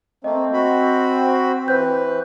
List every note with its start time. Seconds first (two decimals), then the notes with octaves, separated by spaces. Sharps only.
0.24 A3 A#3 C4 D#5
0.53 F#4 B5
1.68 E3 B4 C5 G6